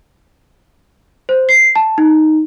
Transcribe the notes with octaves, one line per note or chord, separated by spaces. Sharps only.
C5
C7
A5
D#4